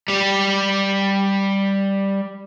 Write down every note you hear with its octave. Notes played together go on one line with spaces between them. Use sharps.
G3 G4